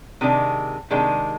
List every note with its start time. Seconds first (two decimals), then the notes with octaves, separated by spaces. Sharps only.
0.21 C3 D#3 G#3 D4
0.90 C3 D#3 G#3 D4